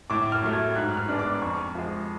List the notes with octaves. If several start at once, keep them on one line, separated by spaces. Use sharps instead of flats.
A2 D6
F6
F#3 A3
G#6
G#2 F#6
F6
G#3 B3 D4
D6
F2 C#6
F3 G#3